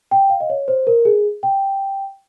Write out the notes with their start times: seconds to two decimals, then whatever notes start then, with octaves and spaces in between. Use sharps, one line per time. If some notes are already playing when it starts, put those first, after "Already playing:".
0.11 G5
0.30 F5
0.40 D#5
0.50 C#5
0.68 C5
0.87 A#4
1.05 G#4
1.43 G5